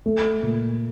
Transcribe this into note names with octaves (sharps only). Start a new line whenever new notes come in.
A3
A#2